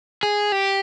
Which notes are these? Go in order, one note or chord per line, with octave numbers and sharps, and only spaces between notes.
G#4
G4